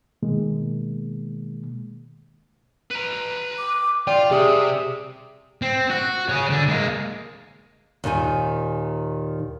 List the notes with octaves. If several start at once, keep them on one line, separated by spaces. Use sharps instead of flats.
B2 D#3 G#3 A#3
B4 A#5
D6
F4 D5 G5 C6
C3 G4 G#4 E5 D#6
C4
F#4
G#4 C#5
D3
G#3 A#3
D#2 A#2 D#3 G#5